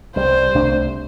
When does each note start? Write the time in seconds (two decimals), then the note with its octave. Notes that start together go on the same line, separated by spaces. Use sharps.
0.16 C2 C3 G3 C5
0.55 C2 C3 A3 D4